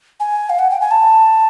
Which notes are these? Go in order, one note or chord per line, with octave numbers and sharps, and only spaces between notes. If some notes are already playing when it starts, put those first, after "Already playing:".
G#5
F5
F#5
G5
G#5
A5